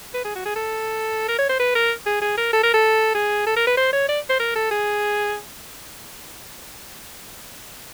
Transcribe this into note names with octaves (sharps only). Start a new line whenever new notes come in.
B4
G#4
F#4
G#4
A4
A#4
C#5
C5
B4
A#4
G#4
G#4
A#4
A4
A#4
A4
G#4
A4
A#4
B4
C5
C#5
D5
C5
A#4
A4
G#4